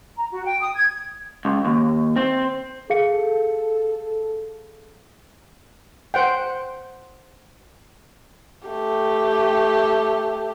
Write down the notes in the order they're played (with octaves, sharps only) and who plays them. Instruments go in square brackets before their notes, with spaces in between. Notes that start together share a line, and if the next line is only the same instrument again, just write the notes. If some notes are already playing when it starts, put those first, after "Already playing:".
[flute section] A#5
F#4
G5
D#6
G#6
[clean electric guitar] C#2
D#2
C4
[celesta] G#4 F5 C#7 [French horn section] A4
[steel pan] C5 F#5 G5
[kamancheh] A3 G4